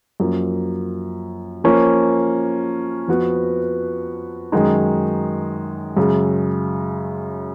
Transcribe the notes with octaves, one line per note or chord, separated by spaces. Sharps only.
F#2 F3 A#3
F3 A#3 C#4
F2 F3 B3 F#4 B4
F#2 D#3 G#3 D#4
F#2 C#3 G#3